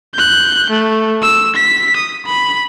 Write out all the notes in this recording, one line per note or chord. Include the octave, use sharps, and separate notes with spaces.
F#6 G6
A3
E6
B6
D#6
B5